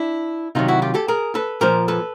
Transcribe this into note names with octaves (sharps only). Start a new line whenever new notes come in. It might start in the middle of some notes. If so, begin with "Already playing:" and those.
Already playing: D4 E4
C3 D#3 F#3 D#4 F4
E4 F#4
F4 G4
G4 A4
G#4 A#4
A4 B4
A#2 F3 A#4 C5
A4 B4